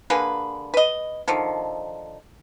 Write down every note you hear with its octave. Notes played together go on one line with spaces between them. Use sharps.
D3 A#3 G#4 B4
B4 D#5
D3 D#3 F3 A4